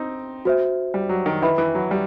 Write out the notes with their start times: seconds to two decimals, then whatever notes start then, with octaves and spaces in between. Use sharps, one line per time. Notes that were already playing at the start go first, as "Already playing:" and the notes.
Already playing: C4 D#4
0.45 F#4 C5 E5
0.94 G3
1.09 F#3
1.26 D#3
1.42 D#3 E4 B4 E5 B5
1.58 E3
1.75 F#3
1.91 G3